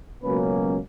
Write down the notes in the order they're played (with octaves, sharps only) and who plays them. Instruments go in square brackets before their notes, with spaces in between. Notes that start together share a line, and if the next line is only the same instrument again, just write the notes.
[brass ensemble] C#2 B2 F#3 A#3 C#4 B4